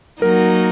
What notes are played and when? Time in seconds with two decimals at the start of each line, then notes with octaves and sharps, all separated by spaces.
0.22 F#3 A#3 D#4 F#4 A#4